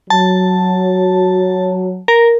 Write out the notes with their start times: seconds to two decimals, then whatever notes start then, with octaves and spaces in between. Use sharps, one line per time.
0.10 F#3 A5
2.08 A#4